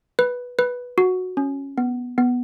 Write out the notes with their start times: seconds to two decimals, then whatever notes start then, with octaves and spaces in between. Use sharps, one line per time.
0.19 B4
0.59 B4
0.98 F#4
1.37 C#4
1.78 B3
2.18 B3